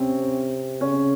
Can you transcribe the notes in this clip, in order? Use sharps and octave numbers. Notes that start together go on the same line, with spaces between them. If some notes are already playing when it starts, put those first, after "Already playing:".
Already playing: C3 C4 C#4
C#3 C#4